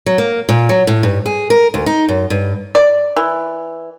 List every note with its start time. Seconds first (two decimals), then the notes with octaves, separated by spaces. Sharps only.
0.06 F#3
0.18 A#3
0.49 A#2
0.69 F#3
0.87 A2
1.03 G2
1.26 G#4
1.50 A#4
1.74 D2
1.86 D#4
2.09 F#2
2.30 G2
2.75 D5
3.16 E3